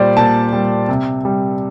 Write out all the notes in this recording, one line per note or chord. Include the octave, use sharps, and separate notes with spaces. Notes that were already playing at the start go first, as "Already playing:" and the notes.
Already playing: A#2 G3 C5 D5
A#2 A5
G3
C3
G3